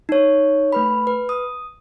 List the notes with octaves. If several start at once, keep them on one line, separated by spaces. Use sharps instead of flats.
D#4 C#5
A3 B4 B5
B4
D#6